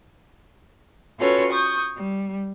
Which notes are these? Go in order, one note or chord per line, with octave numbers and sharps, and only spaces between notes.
C#4 F4 F#4 A4 B4 C#5
C#6 D#6 G6
G3